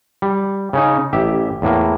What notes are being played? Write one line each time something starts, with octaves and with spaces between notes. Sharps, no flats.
G3
C#3 C#4 D#4
A1 G4 E5
E2 A2 A#3